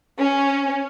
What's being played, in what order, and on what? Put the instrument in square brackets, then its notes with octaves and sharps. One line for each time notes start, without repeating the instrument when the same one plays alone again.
[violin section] C#4